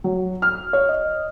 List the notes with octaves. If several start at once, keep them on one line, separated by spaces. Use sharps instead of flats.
F#3
F6
C#5
D#5